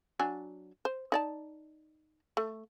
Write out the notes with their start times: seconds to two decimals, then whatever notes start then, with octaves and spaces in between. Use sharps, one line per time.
0.19 F#3 D4 G#5
0.85 C5
1.12 D#4 D5 A5
2.37 A3